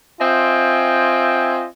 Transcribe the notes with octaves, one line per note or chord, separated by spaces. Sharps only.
C4 F4 D#5 E5 G5 G#5